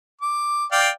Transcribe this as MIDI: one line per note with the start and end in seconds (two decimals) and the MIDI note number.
0.21 0.65 86
0.72 0.89 74
0.72 0.89 77
0.72 0.89 79